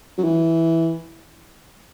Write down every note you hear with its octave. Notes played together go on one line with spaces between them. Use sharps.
F#3
E3